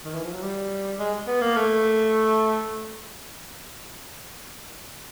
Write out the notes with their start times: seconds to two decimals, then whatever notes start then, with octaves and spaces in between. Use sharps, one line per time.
0.04 D#3
0.14 E3
0.24 F3
0.32 F#3
0.42 G3
0.99 G#3
1.27 B3
1.41 A#3
1.56 A3